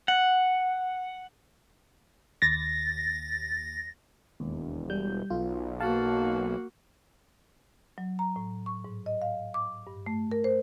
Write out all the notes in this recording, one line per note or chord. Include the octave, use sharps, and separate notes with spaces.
F#5
D#2 A6 A#6
E1 D#2
G3 G6
B1 F4
A#3 F#4 F5 A5
F#3
A#5
A2
C#6
G#2
D#5
F5
D6
G2
A3
A#4
C5